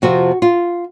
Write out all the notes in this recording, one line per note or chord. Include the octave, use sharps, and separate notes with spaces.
F2 C3 F3 C4 F4 F#4
F4